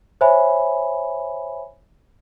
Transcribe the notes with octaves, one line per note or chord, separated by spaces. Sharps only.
C5 C#5 E5 G#5 B5